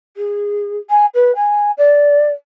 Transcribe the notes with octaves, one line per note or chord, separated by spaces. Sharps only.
G#4
G#5
B4
G#5
D5